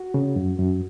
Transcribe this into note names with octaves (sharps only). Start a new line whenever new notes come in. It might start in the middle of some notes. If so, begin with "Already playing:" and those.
Already playing: F#4
C#3
F#2
F#2